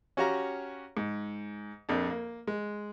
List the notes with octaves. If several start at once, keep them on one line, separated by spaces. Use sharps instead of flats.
C#4 F#4 G4 C#5 F5 A#5
G#2
A#1 F2 D4
A#3
G#3